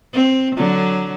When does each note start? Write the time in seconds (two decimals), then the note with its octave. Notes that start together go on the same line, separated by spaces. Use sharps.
0.13 C4
0.56 D3 F#3